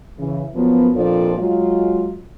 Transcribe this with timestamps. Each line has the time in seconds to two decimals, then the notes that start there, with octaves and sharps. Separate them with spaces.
0.19 C#3 E3
0.55 F#2 F3 F#3 A#3 B3
0.95 F2 A#2 F3 D4 A4 D5
1.39 F#3 G#3 F4